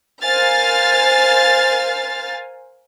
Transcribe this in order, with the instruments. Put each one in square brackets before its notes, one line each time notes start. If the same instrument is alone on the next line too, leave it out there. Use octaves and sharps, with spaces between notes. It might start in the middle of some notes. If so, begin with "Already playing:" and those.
[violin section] A#4 C5 F5 G#5 F6 A6